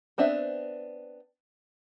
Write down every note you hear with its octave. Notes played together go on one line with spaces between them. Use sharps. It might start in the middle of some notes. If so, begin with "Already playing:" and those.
B3 C4 D4 C5 E5